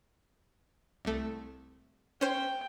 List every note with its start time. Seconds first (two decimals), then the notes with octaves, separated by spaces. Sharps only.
1.05 C2 A3
2.21 C#4 C5 G5